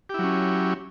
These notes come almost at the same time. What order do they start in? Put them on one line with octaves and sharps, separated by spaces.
G4 E4 F#3 C#4